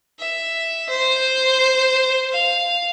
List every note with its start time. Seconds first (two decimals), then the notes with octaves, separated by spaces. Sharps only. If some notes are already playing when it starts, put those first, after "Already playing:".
0.20 E5
0.89 C5
2.32 F5